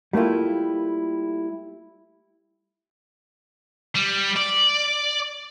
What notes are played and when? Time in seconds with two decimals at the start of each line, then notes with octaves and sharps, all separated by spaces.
0.13 G3 A3 A#3 E4 F4
3.95 G3
4.36 D5